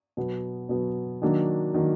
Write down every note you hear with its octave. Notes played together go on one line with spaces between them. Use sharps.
B2 F#3 B3
B2 F#3 B3
D#3 F#3 A#3 D4
D#3 F#3 A#3 D4